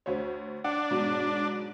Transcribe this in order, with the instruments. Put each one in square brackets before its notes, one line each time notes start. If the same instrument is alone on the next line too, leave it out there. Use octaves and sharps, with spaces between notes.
[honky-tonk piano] D2 C5 C#5
[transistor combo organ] D4 [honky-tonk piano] F#5
[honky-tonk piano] G#2 B2 F#3